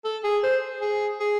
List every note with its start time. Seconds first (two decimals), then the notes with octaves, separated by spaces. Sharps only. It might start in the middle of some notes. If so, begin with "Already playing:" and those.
0.05 A4
0.24 G#4
0.43 C5
0.81 G#4
1.20 G#4